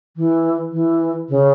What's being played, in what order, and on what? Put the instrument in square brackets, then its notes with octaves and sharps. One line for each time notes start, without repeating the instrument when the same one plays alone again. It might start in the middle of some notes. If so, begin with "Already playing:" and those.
[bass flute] E3
E3
C#3